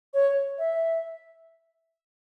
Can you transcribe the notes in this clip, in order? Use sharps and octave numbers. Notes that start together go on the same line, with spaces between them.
C#5
E5